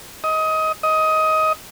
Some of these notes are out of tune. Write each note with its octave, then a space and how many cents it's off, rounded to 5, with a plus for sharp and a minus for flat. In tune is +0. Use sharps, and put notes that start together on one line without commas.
D#5 +20
D#5 +15